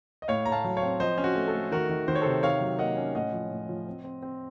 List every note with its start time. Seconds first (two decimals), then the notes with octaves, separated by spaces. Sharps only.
0.22 D#5
0.28 A2 C#5 F5
0.46 A2 A#5
0.52 F5 A5
0.64 F#3
0.77 C#5 F5
0.82 C4
1.00 F3 C5 D#5
1.18 C#4
1.24 F#4
1.36 A3
1.48 A4
1.54 A3
1.72 D#3 F#4 A#4
1.89 D#3
2.08 D#3 C5
2.15 C#5
2.22 C3 A4 C5
2.43 D#3 C#5 F5
2.61 F#3
2.79 A#3 D#5 F#5
2.97 C#4
3.15 A2 D#5 F#5
3.33 F3
3.51 A2
3.69 F3
3.87 C4
4.04 C4
4.22 C4